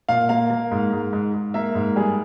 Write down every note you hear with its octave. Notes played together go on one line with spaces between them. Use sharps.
A#2 F5
A#3 F5
A#3
G#2
G#2
G#2
G#2
A#3 E5
G#2
G3 G#4